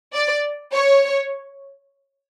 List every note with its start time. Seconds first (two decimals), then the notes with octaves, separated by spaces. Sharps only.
0.14 D5
0.75 C#5